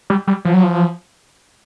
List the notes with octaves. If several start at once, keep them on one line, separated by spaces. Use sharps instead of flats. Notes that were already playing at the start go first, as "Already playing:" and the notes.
G3
G3
F3
F#3
F3